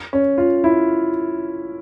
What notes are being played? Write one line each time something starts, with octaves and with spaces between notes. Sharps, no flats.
C#4
F4
E4